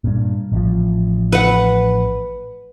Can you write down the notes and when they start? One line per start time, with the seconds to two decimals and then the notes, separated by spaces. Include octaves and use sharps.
0.04 G2 A#2
0.52 A1 F3
1.32 B4 F#5